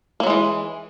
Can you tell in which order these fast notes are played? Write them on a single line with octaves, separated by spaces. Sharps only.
A#3 F#3 G#3 E3